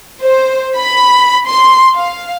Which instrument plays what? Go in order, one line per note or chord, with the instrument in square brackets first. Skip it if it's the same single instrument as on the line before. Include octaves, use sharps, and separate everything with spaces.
[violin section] C5
B5
C6
F5